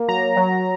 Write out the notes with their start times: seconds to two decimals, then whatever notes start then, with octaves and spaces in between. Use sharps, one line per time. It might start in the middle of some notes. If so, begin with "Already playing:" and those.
Already playing: A#3
0.08 F#3 A#5
0.37 F#3